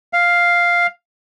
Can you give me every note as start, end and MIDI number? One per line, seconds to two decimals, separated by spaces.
0.13 0.87 77